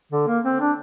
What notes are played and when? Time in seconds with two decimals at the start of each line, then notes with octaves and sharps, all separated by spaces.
0.12 D3
0.27 A#3
0.45 C4
0.61 D4